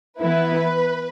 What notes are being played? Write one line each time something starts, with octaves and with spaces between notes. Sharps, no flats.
E3 B3 E4 B4